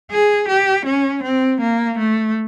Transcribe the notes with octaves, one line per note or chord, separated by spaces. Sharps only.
G#4
G4
C#4
C4
A#3
A3